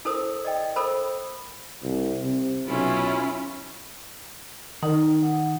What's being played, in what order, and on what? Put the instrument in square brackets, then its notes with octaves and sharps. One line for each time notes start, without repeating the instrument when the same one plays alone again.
[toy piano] E4 A4 A#4 C5 C#5 D#6
D5 D#5 G5
A4 A#4 C5 B5
[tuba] C2
C3
[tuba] B1 [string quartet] C#4 E4 F4
[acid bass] D#3 [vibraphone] D#4
[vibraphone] F#5